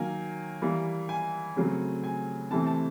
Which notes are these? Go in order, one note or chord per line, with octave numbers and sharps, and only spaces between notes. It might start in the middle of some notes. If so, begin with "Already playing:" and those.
Already playing: D#3 F#3 A#3 G#5
E3 G3 A#3
G#5
C#3 F#3 A3 C4
G#5
C3 E3 A3 C4 A5
A5